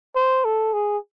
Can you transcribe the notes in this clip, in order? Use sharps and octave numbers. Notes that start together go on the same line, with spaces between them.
C5
A4
G#4